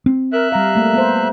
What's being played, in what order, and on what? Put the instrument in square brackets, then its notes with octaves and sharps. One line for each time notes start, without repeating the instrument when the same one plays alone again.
[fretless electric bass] C4
[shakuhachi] A#4 [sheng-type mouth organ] E5 F#6
[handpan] G3 F5 [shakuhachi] A#5
[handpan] A3 A#3
B3 C5